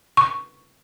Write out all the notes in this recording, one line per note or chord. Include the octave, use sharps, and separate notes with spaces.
C#6